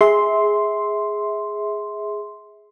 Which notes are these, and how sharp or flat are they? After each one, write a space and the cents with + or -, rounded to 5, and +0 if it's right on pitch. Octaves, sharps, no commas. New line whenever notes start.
G#4 +0 E5 -25 C6 +0